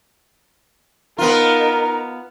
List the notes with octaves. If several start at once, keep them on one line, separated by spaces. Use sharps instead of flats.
B3 D#4 F4 A#4 A#5